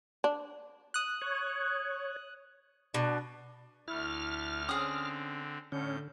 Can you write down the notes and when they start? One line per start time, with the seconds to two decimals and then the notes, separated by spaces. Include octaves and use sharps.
0.24 D4
0.94 D#6 F#6
1.22 C#5
2.94 B2 D4
3.88 D2 A3 E4 F6
4.69 D3 C4 C#4 G#4 D#6
5.72 A2 D3 C#4 G6